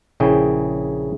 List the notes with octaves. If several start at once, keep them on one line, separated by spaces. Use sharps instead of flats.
A#1 C#3 E4 G#4 G5